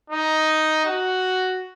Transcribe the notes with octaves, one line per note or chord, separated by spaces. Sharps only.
D#4
F#4